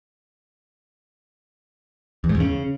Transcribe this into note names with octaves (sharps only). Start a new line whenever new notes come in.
E2
G#2
E2
C#3